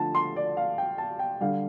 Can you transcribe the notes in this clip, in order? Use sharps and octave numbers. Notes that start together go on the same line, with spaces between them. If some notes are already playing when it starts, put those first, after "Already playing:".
Already playing: D3 F3 A3 A5
C6
D5
F5
G5
A5
G5
D3 G3 F5